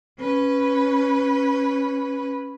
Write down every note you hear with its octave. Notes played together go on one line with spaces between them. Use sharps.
C#4 B4